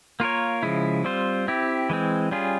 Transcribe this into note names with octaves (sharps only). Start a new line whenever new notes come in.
A#3 F4 A#4 C#5
C#3 F3 G#3 E4
G3 C4 F4 C5
C4 E4 G4
E3 G#3 C4
G3 C#4 F4 G#4